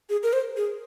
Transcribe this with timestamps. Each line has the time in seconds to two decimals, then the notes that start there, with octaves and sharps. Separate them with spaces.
0.09 G#4
0.23 A#4
0.33 C5
0.57 G#4